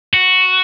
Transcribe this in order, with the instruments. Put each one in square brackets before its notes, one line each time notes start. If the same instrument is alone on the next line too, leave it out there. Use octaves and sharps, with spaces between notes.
[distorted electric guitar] F#4